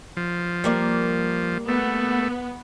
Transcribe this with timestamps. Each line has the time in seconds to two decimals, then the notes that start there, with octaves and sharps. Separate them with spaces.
0.17 F3
0.64 G3 A#3 D5
1.68 A3 B3